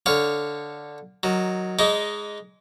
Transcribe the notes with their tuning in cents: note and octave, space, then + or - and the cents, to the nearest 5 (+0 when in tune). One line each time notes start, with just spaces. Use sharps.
D3 +0 C#5 +0 F5 +0
D#3 +0 F#3 +0
G#3 +0 D#4 +5 D5 -35